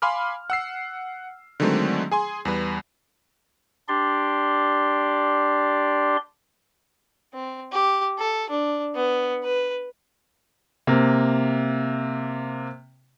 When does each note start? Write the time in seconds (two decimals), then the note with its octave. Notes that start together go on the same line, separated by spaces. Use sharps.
0.02 F5 G#5 B5 C6 D6 F6
0.50 F#5 E6 C7
1.60 D3 D#3 F#3 G#3 A3 C4
2.11 G#4 G#5 C6
2.45 E2 G3 B4
3.88 D4 G4 D5 C6
7.34 C4
7.73 G4
8.19 A4
8.50 D4
8.95 B3
9.44 B4
10.87 C3 A#3